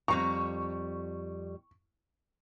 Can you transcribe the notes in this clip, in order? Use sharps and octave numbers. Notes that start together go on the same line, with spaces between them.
F2 G3 A#5 C#6